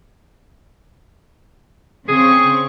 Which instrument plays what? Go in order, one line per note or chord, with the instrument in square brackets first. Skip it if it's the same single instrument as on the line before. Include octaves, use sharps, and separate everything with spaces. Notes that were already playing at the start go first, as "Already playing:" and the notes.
[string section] C#3 C4 C#6 [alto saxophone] G#4